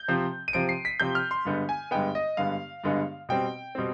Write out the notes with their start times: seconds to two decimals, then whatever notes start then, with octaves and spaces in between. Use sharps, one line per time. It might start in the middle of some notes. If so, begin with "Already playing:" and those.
Already playing: G6
0.08 C3 F3 C4
0.48 D#7
0.53 C3 F3 C4 D7
0.69 C7
0.85 B6
1.00 C3 F3 C4 G6
1.15 F6
1.31 C6
1.45 G2 D3 G#3 B3
1.69 G#5
1.91 G2 D3 G#3 B3 G5
2.15 D#5
2.37 G2 D3 G#3 B3 F5
2.84 G2 D3 G#3 B3
3.29 B2 G3 C4 G5
3.75 B2 G3 C4